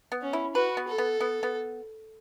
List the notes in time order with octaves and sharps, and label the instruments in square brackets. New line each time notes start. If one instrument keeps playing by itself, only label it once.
[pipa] B3
[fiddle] C#4
[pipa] E4
[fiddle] F#4 [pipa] B4
[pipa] B3
[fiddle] A4
[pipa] B3
B3
B3